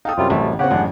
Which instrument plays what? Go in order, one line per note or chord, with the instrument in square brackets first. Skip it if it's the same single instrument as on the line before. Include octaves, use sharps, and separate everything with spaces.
[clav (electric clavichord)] D#4 A4 [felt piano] F5 G5 D#6
[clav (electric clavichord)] F#2 C3 G3 [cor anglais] F4
[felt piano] A1 G4 [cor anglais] A3
[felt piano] C#3 C4 [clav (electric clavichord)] G4 C#5 [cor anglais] F#5
[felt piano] A1 F#2 [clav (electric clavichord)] G#3 D4